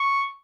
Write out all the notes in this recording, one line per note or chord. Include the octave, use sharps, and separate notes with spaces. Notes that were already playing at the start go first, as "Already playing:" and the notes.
Already playing: C#6